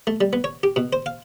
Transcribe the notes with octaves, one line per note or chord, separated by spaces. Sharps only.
A3
G3
B3
C#5
G4
B2
C5
F5